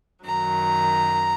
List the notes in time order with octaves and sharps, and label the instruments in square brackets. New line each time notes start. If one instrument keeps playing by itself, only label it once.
[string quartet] F#2 D#3 F#3 A#5